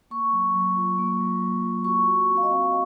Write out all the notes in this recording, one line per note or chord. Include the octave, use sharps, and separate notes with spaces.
A#3 C#6
F#3
F#3
F4
A#3
F#3
F#3
F4
F#4 C#6
F#4
C4
F5
D#5
C4